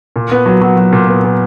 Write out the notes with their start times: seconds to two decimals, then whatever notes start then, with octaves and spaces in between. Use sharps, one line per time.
0.16 A#2
0.32 B3
0.46 F#3
0.61 F#3
0.77 F#3
0.92 A#2
1.08 B3
1.24 A#2